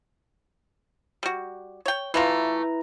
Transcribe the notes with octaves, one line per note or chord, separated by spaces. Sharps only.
G3 F#4
C#5 G5
E3 A3 E4 F4 B4 A#5